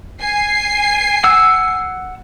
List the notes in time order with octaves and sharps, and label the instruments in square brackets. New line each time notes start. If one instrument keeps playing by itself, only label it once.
[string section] G#5 C7
[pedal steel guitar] F#5 E6